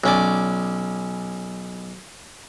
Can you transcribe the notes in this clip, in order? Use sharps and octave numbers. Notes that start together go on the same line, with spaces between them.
B1 C#4 D5